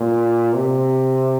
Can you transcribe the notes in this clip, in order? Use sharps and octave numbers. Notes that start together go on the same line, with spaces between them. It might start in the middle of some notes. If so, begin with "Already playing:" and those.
Already playing: A#2
C3